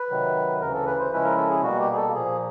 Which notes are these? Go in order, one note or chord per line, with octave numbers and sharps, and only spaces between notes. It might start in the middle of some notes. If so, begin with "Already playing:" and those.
Already playing: B4
C3 D#3 F#3
D2 C#3 E3 A#4
A4
B4
C5
C#3 F3 G#3 C#4 E4 B4
A#4
A4
G#4
B2 G3 A#3 F#4
G4
G#4
A4
A#2 F3 A#3 G#4